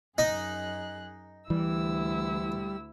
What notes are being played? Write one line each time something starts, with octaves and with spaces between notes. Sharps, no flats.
F#2 D#4 G#4 F#6
D2 E3 G3 E4 E6